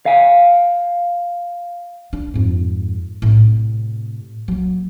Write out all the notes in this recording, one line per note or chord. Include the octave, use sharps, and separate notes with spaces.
F5 G#5
D4
F2 G#2
A2 C3
F#3 A#3